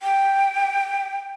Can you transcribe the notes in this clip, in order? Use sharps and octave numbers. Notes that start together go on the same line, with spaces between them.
G5